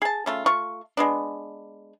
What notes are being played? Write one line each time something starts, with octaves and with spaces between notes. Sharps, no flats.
G#4 A5
C#3 A3 F4
A3 F4 C#6
G#3 B3 D4